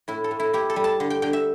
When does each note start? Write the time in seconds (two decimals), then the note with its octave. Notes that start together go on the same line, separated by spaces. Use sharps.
0.08 A2 E4
0.24 A4
0.31 A2
0.40 E4
0.53 E4 G4
0.70 A4
0.76 G3
0.84 A5
1.00 D3
1.10 G5
1.22 D3 G5
1.33 E5